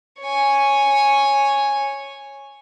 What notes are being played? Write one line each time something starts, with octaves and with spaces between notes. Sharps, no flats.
C#5 G#5